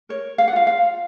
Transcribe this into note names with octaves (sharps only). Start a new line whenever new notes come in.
A#4 C#5
F5
F#5
F4 F5
F5